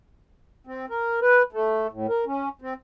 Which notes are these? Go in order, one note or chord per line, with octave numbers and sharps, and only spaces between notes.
C4
A#4
B4
A3
A2
A#4
C#4
C4